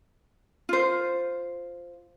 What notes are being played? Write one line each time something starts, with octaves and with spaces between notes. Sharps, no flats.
F4 C5